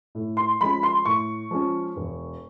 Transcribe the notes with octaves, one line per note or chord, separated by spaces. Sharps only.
A2
C6
F3 G#3 C#4 B5
C6
A2 C#6
F3 G#3 C#4
E1